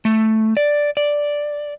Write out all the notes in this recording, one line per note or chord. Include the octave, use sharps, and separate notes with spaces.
A3
D5
D5